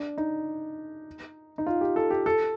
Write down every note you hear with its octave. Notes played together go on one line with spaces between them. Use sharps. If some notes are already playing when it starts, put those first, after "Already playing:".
Already playing: D4
D#4
D#4
F4
G4
A4
G4
A4